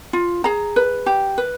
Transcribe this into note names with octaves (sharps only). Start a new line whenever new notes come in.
F4
G#4 A#5
B4
G4
B4